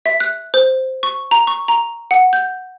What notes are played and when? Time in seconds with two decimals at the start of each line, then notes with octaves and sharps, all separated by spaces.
0.06 E5
0.20 F#6
0.54 C5
1.03 C#6
1.31 A#5
1.47 C#6
1.68 A#5
2.11 F#5
2.33 G6